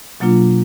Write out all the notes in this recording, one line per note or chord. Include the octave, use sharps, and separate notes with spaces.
B2 F#3 A#3 D4 F4